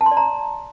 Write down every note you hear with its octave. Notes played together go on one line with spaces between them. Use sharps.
A5
C6
D5
A#5